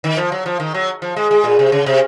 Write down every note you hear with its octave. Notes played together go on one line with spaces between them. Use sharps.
D#3
F3
F#3
F3
D#3
F#3
F3
G#3
G#3
A#2
C3
C#3
C3